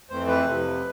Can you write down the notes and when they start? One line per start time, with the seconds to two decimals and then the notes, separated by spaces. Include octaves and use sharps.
0.10 F2 E3 A3 C4 C5
0.28 B4
0.46 F2 C3 F3